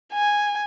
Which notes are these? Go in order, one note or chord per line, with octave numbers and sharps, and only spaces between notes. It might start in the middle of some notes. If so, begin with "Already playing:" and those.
G#5